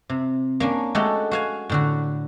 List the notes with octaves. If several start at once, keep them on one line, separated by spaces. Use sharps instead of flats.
C3
A#3 C#4 D4
G#3 A3 F#4 G4 A4 F#5
F#4 F5 G#5
A2 D3 F#4